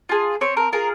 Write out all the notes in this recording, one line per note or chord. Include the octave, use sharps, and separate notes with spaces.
F4 G#4
C4 C#5
A#4
F4 G#4 A#4